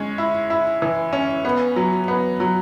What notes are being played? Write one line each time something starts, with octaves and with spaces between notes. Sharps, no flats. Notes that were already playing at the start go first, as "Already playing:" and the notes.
Already playing: G#3 C#4
E4
E4
E3
C#4
B3
F#3
B3
F#3